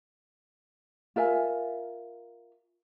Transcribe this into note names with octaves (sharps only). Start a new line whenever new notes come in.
F4 A#4 E5 G#5